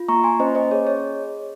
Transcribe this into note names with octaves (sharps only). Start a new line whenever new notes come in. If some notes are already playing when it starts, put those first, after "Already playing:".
Already playing: F4
A#3 A#5 C#6
G#5 C6
C#4 C5 D#5
C5 D#5
G#4 C#5
C#5